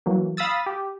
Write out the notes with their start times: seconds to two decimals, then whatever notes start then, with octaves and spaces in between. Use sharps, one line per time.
0.06 E3 F#3 A#3
0.37 F5 B5 D#6 E6 A6
0.66 G4